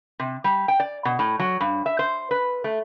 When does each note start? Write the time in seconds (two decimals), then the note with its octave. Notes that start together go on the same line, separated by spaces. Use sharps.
0.19 C3
0.44 G3
0.68 G5
0.80 D5
1.05 B2
1.19 A2
1.39 F#3
1.61 G2
1.86 E5
1.99 C5
2.31 B4
2.64 A3